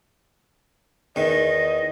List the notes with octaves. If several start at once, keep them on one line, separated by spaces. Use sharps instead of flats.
E2 D#3 D#5